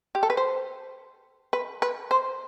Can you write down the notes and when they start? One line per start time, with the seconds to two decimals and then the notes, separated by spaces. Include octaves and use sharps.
0.15 G4
0.23 A4
0.30 B4
0.37 C5
1.53 B4
1.82 B4
2.11 C5